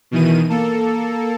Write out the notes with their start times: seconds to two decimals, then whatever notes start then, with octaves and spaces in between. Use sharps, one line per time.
0.11 B2 D#3 E3 D#7
0.49 A#3 A4